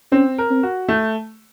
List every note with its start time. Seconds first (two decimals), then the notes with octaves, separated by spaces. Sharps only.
0.12 C4 C#4
0.38 A#4
0.51 C4
0.63 F#4
0.89 A3